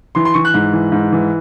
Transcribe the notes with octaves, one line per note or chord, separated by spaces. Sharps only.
E3 C6
C6
E3 C#6
F#6
G#2
E3
G#2
E3